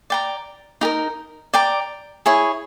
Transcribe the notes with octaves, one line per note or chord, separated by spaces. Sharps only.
D5 G5 A#5
D#4 G4 A#4
D5 G5 A#5
E4 G#4 C#5